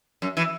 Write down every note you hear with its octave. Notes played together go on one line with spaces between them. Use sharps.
F#2
E3